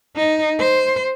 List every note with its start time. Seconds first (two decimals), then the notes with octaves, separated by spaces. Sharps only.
0.16 D#4
0.60 C5